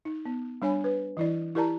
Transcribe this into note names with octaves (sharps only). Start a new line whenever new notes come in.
D#4
B3
G3 D4 C#5 G#5 B5
B4
E3 E4 D5
E4 G4 A#4 D5 A5 A#5